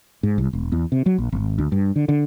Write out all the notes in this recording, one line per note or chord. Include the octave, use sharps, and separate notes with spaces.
G#2
C2
E1
E2
C3
F#3
A#1
G#1
D2
G2
D3
D3